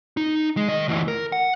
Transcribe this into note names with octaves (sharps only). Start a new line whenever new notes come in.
D#4
G#3
D#3 D#5
D2 E3
A#4
F#5